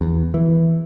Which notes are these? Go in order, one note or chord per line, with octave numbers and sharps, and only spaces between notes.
E2
E3